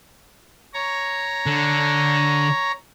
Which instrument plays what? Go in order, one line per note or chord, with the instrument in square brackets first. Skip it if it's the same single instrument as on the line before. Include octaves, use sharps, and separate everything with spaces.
[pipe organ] C#5 A#5
[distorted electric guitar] D3